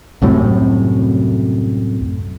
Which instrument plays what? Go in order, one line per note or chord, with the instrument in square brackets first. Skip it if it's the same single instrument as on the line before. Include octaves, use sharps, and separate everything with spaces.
[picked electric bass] C2 F#2 A2 C3